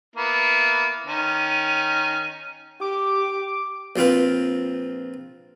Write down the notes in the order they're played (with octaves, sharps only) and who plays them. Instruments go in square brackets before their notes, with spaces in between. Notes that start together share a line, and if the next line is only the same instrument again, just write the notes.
[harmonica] A#3 B3 E4
D#3 C#4
[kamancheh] G4 [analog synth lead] D6
[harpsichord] A#1 F3 C4 F4 B4